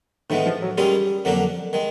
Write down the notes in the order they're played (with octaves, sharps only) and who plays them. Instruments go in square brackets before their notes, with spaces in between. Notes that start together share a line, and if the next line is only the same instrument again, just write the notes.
[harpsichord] A2 E3 G#3 B3 [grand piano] D#3
[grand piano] F3
F#3
[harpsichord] D#3 G#3 C#4 F4 G#4 [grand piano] G3
[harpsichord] F2 D3 F#3 A#3 D4
D#3 G#3